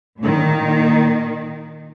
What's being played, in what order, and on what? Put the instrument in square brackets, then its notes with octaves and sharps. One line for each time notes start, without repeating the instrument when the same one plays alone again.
[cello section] A#2 D#3